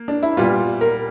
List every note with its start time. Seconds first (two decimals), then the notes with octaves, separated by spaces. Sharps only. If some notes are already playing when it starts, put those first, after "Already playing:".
Already playing: A#3
0.08 D4
0.23 E4
0.37 A#2 G3 B3 F4
0.81 A#4